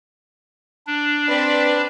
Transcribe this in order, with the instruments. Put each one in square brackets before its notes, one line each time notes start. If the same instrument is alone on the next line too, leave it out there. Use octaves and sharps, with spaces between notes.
[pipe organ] D4
[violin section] C4 B4 D5